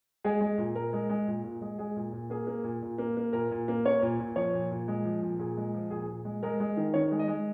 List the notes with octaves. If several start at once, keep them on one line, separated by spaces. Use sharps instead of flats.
G#3 G#4
G#3
A#2
A#2 A#4
G#3
G#3
A#2
A#2
G#3
G#3 G#4
A#2
A#2
A#3 G#4
A#3
A#2
A#2
A#3
A#3
A#2 A#4
A#2
A#3
A#3 C#5
A#2
A#2
F3 C#5
A#2
A#2
G#3
F3
A#2
A#2 G#4
G#3
F3
A#2 G#4
A#2
G#3
G#3 A#4
G#3
D#3
D#3 C#5
G#3
D#5
G#3